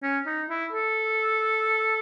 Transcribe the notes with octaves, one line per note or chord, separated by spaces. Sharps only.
C#4
D#4
E4
A4